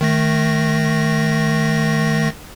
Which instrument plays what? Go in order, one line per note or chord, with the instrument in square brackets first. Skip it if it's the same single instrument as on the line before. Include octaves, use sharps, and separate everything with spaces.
[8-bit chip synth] D#3 A3 A#6